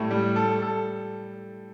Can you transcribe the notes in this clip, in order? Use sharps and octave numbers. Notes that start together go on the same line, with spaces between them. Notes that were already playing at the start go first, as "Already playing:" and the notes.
Already playing: A2 G3 A4
G3
A4
A4